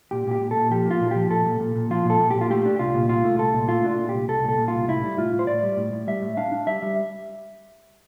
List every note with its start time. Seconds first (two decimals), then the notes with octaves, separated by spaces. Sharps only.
0.11 A#2 G4
0.27 A#2 G4
0.41 A#2
0.51 A4
0.56 A#2
0.71 F3 G4
0.86 A#3 F4
1.01 A#2
1.11 F3 G4
1.31 A#2 A4
1.46 A#2
1.60 A#2
1.76 A#2
1.90 F3 F4
2.05 A#2 A4
2.20 A#2
2.31 A#2 G4
2.41 F4
2.50 A3 G4
2.65 D4
2.79 C2 F4
2.95 A#2
3.09 C2 F4
3.24 A3
3.39 C2 A4
3.54 A#2
3.69 A3 F4
3.85 D4 F4
3.98 A#2
4.09 G4
4.14 C2
4.28 C2 A4
4.44 A#2 A4
4.58 A#2
4.68 F4
4.74 C2
4.88 A2 E4
5.03 G3
5.18 A2 F4
5.32 A2
5.39 C5
5.47 A2 D5
5.63 G3
5.77 A2
5.93 A2
6.07 G3 E5
6.22 A2
6.37 D4 F5
6.52 D4
6.67 G3 E5
6.82 G3